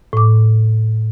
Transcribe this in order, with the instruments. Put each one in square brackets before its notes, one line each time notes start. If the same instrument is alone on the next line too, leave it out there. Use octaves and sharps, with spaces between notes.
[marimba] A2 D6